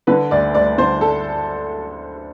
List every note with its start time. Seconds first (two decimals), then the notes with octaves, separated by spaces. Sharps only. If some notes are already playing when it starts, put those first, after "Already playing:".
0.07 D3 B4
0.31 D2 D5
0.54 D2 D5
0.78 D3 C5
1.01 A4